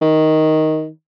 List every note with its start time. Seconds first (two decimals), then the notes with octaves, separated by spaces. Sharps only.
0.02 D#3